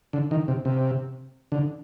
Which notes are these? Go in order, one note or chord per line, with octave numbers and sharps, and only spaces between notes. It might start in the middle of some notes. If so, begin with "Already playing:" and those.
D3
D#3
C3
C3
D3